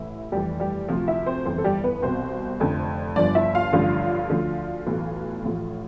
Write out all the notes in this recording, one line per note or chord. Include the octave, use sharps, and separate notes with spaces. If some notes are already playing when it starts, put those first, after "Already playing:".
Already playing: A1 A2 E3 E4
F1 F2 E3 G3 G4
G3 G4
D2 C3 F3 F4
E4 E5
C4 C5
G1 F2 E3 C4 C5
A4
G3 G4
B3 B4
C2 B2 C4 C5
F1 F2 D3
G1 G2 F3 D4 D5
E4 E5
F4 F5
A1 G2 D3 F3 F4 F5
D2 D3 F3
B1 A2 E3
A1 A2 F3